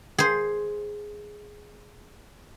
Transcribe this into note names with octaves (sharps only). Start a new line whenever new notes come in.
G#4 C5